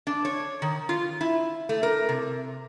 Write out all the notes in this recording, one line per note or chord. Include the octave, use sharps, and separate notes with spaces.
D4
C#5
D#3
F4
E4
A3
A#4
C3